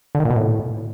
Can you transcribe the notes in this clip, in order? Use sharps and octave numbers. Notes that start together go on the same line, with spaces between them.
D3
D#3
A#2
B2
A2